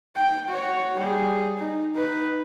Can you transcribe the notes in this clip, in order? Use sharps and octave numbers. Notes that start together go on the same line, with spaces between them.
G5
F#4 C#5
G3 G#4
D#4
D#4 B4